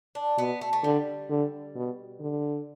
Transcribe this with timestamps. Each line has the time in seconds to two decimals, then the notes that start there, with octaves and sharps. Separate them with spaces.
0.15 D4
0.38 B2 B3
0.61 A3
0.73 A3
0.83 D3 G3
1.30 D3
1.75 B2
2.20 D3